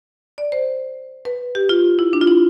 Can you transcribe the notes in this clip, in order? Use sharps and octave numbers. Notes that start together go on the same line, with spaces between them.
D5
C5
B4
G4
F4
E4
D4
F4
E4